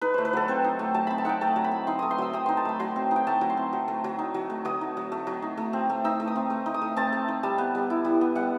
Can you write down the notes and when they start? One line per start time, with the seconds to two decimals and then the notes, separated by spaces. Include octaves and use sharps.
0.01 D#4 B4
0.14 A3 C5
0.25 B4
0.33 F#3 A4
0.48 C4 C5
0.64 D#4
0.79 A3
0.94 F#3 A5
1.07 C4 B5
1.18 A5
1.25 D#4 F#5 G5
1.41 A3 A5
1.56 F#3
1.64 B5
1.71 C4
1.87 D#4 C6
1.99 A3 D#6
2.11 C6
2.18 F#3 E6
2.33 C4 D#6
2.46 D#4 C6
2.57 A5
2.65 A3 B5
2.79 F#3 C6
2.96 C4
3.11 D#4
3.16 G5
3.27 A3 A5
3.41 F#3
3.50 C6
3.57 C4
3.73 F#3
3.88 A3
4.04 F#3
4.19 D#4
4.34 F#3
4.50 A3
4.65 F#3 D#6
4.81 D#4
4.97 F#3
5.12 A3
5.27 F#3
5.42 D#4
5.57 A3
5.73 C4
5.90 A3
6.04 D#4 E6
6.20 A3
6.27 D#6
6.36 C4
6.50 A3
6.66 D#4
6.74 D#6
6.82 A3
6.96 C4 A5
7.13 A3
7.28 D#4
7.43 G3 A5
7.58 B3
7.75 G3
7.90 E4
8.05 G3
8.21 B3
8.35 G3 F#5